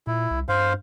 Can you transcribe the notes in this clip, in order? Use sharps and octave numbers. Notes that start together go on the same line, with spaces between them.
A#2 E4
C2
G2 C5 F5